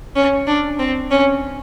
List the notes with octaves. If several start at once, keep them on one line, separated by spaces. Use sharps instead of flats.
C#4
D4
C4
C#4